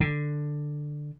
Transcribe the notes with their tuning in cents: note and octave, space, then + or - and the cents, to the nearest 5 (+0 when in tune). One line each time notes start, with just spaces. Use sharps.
D3 +10